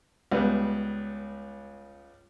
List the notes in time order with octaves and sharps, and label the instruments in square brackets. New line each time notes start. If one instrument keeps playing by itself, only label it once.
[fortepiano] C#2 G3 B3